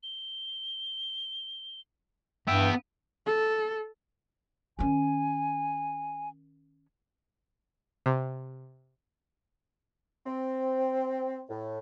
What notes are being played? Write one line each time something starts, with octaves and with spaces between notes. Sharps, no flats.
G7
G2 B3 E5 G5
A4
D#3 C#4 G#5
C3
C4
A2